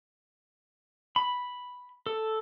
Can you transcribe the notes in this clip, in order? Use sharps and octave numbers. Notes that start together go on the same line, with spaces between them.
B5
A4